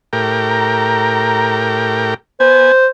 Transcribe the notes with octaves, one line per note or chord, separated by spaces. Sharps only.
A2 G4 A#4
A#5
B3 C5 G#5